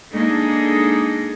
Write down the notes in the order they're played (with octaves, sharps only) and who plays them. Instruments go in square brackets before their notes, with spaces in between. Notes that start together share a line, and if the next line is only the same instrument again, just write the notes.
[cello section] G#3 A#3 D4 D#4 G#4 A4